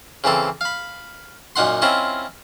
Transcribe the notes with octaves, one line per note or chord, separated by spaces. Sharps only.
C#3 E3 C4 A4
F5 B5
F#2 A#2 D#4 F#5 C6
C4 C#4 E4 F4 D#5